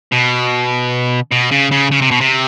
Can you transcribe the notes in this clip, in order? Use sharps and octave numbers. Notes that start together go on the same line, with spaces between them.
B2
B2
C#3
C#3
C#3
C3
B2
C3